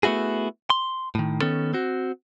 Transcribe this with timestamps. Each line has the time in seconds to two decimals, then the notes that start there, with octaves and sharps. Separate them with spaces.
0.03 A3 B3 E4 F#4 G#4
0.70 C6
1.15 A2 D#3
1.41 D#3 B3 C#4 A4
1.73 C4 F#4